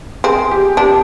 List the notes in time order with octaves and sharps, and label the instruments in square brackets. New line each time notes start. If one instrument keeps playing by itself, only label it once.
[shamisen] C4 [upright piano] G#4
[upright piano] G4
[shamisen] D4 [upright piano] G4